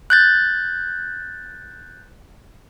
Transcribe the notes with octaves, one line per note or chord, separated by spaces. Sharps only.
F#6 G6 A6